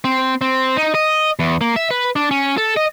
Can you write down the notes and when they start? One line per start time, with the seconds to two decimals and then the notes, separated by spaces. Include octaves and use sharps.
0.04 C4
0.41 C4
0.77 D#4
0.95 D#5
1.39 E2
1.61 A#3
1.76 E5
1.91 B4
2.16 D4
2.31 C#4
2.57 A4
2.76 D#5